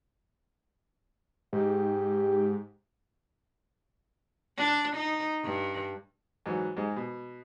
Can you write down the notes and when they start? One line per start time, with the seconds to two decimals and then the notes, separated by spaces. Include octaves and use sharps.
1.53 G#2 G4
4.57 D4
4.96 D#4
5.44 G2
6.46 G#2 E3 F#3
6.77 G#2 G#3
6.96 B2